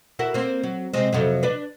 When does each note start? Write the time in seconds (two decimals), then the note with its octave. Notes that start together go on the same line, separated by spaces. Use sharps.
0.19 E4 F#4 A#4
0.34 A#3 C4
0.63 F#3
0.93 C3 G#3 C4
1.13 F2 C3 F#3
1.43 D4 B4 D5